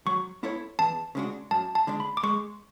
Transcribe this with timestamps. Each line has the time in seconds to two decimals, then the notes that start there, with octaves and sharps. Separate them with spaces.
0.06 F#3 C#6
0.43 B3 E4 A4 C#5
0.79 E2 A5
1.15 C#3 G#3 D4 F#4
1.51 F#2 A5
1.75 A5
1.87 D3 G#3 D4
2.00 B5
2.17 D6
2.23 G#3 C#6